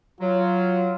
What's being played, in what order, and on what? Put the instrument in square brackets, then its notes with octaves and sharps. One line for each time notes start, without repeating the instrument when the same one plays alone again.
[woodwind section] F#3 [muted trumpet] F4